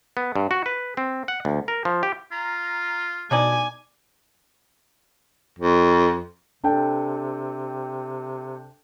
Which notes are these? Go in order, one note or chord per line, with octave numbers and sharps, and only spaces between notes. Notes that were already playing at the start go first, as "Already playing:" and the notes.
B3
G2
F#4
B4
C4
F#5
D2
A#4
F3
G4
F4 A#5
B2 D4 D#4 D5 G#5
F2
C3 D4 A4 G5